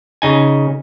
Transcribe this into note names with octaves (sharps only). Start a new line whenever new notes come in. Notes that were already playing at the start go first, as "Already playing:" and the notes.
C#3 D#4 G#5